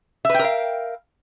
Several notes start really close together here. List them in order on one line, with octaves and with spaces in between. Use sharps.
E5 B4 G5 A#4 F5